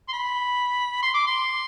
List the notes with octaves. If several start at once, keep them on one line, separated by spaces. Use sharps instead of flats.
C6
B5
C6
D6
C6